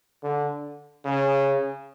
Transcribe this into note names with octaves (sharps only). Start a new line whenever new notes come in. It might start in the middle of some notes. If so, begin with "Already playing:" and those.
D3
C#3